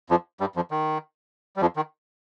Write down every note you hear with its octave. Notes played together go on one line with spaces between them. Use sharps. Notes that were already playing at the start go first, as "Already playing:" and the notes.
F2 F3
G2 G3
F2 F3
D#3
G3
F2 F3
D#3